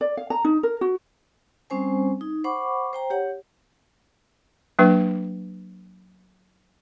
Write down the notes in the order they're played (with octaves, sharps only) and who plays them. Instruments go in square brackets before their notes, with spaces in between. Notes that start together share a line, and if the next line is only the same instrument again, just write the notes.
[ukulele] D5
F5
A#5
D#4
A#4
F#4
[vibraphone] G3 C4 C#4 C5 G#5
D#4
C5 F#5 B5 C#6 D6
C5 G5 A#5
G4 C#5 F#5
[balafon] F#3 A#3 D4 B4